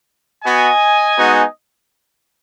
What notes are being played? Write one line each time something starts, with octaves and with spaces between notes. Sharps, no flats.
B3 F#4 D#5 G#5
G#3 B3 D#4 F#4